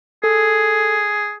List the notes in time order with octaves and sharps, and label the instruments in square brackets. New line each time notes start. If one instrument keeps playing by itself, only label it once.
[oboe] G#4 [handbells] A4